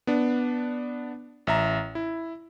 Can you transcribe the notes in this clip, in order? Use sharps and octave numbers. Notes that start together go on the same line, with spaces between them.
B3 D4
A1 E5 A#5
E4